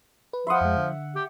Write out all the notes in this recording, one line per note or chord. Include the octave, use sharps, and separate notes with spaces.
B4
F3 E5 F#5 B5 C6 D#6
F2 G#3
D3
G4